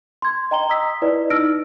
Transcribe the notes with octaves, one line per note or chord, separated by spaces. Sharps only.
C6 G#6
D#5 G5 A#5 C6 G7
A#5 D#6 E6 B6
E4 B4 D5 D#5
D#4 E6 F6 A#6 D7